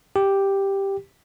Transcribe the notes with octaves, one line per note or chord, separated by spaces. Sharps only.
G4